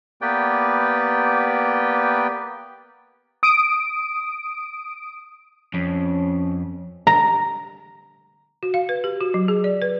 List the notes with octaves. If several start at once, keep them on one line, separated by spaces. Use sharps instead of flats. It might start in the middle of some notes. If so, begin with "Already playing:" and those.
A#3 B3 G4 B4 D5 G5
D#6 D7
F2 C#4
A#5
F#4
F5
B4
G4
F#4
F#3
G#4
D5
B4